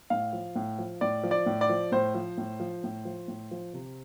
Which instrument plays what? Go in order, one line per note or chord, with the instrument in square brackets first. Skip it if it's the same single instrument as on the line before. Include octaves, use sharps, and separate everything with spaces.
[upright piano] A2 F5
F3
A2
F3
A2 D5
F3
D5
A2
D5
F3
A2 C5
F3
A2
F3
A2
F3
A2
F3
C3